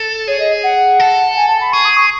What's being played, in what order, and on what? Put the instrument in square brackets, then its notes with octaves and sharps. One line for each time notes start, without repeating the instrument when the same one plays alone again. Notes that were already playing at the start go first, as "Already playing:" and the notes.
Already playing: [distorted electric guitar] A4
[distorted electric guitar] G#4 [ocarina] C#5
[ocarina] D#5
F#5
[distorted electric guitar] A4
[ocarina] G#5
A5
B5
[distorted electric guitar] G#4 [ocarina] C#6
[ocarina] D#6
C#6